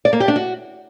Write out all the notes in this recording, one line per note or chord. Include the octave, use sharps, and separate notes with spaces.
D5
A#3
G4
D4
F#4